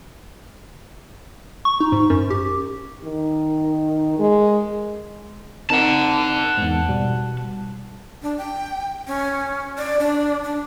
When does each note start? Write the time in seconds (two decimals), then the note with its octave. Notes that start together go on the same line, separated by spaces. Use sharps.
1.65 C#6
1.80 D#4
1.92 G#2
2.10 F#2
2.30 G4
3.04 D#3
4.19 G#3
5.70 C4 D#4 A#4 F#5 A5
6.57 E2 G#2
6.89 B2 G3
8.23 D4
8.38 G5
9.08 C#4
9.78 D5
10.00 D4
10.43 D4